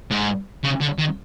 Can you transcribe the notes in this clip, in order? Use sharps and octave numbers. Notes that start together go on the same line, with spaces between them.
G#2
C#3
D3
D#3